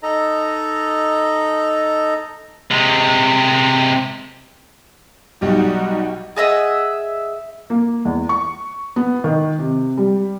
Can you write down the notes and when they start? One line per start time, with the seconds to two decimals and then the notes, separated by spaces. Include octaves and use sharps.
0.03 D#4 A4 D#5 A#5
2.71 C3 G#3
5.41 B1 G3 D#4 F#4 G4
6.37 G#4 D#5 E5 F#5
7.70 A#3
8.05 E2
8.29 C#6
8.96 B3
9.24 D#3
9.59 C3
9.97 G3